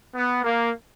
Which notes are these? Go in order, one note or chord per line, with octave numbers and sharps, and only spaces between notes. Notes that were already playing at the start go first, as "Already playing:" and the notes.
B3
A#3